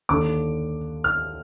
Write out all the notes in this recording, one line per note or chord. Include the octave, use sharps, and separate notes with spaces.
D#2 D3 D6
F6